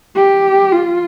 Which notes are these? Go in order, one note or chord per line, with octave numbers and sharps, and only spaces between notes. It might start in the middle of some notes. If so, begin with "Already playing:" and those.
G4
F4